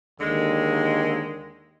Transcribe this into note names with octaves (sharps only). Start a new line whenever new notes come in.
D#2 D3 G#3